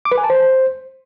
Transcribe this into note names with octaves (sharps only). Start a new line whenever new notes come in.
D6
B4
G#5
A5
C5